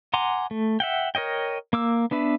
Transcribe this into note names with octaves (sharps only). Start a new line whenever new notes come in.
F#5 G#5 A#5 C6 D6
A3
E5 F#5 G5
A#4 C#5 D#5 G5
A#3 D6 E6
B3 D4 B4 E5